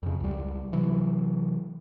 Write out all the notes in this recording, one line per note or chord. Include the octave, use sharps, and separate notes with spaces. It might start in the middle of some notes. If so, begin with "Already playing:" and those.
F2 C#3
C#2 G3
C3 E3 F#3